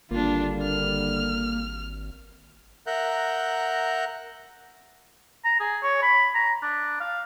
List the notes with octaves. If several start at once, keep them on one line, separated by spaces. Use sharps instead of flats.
G#1 D3 G3 A#3 D4 F4
F6
A#4 E5 F#5 A#5 F#6 G6
A#5
G#4
C#5
B5
A#5
D4
F5